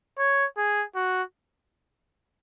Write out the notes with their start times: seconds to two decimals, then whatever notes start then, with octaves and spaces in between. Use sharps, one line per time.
0.19 C#5
0.57 G#4
0.95 F#4